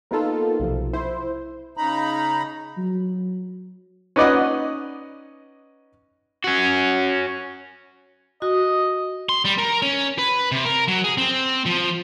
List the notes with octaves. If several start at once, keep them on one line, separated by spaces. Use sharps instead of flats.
A#3 B3 D#4 F4 A4
B1 C3 F3
E4 C5
C#3 D#4 A#5 B5
F#3
C#4 D#4 B4 D5 D#5 F#5
C#4 F#4
F#4 D#5
C6
G3
A#4
C#4
B4
C3
A#4
F#3
G#4
C4
F3